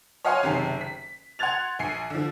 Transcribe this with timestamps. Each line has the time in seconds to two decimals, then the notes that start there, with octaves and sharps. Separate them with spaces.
0.25 C#5 D#5 F5 F#5 G#5 C6
0.43 F#1 C3 D#3 C7
0.81 B6
1.39 F#5 C6 F#6 G#6 A6 F7
1.79 A#1 G#5 C7 C#7
2.10 D3 F3